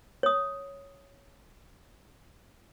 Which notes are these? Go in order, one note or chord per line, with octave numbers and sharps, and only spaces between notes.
C#5 D#6